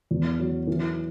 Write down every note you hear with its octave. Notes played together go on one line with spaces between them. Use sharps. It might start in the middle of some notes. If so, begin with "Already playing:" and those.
E2
F#3
E3